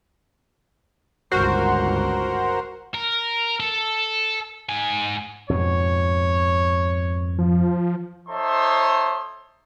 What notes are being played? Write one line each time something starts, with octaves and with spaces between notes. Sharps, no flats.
G1 C#2 F#4 A#4 C5
A#4
A4
G#2 G#5
F2 G#2 B2 C#5
F3
D#4 A4 C5 C#5 E5 C6